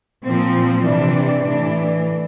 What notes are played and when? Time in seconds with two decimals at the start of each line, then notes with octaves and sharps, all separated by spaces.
0.24 A#2 F3 C4
0.84 C3 E3 D4
1.43 A2 E3 D4